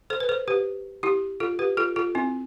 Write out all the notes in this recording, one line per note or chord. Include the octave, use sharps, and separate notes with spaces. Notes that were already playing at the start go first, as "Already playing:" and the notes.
A4 C5
B4
A4 C5
G4 B4
E4 G4
F4 A4
G4 B4
F4 A4
F4 A4
C4 E4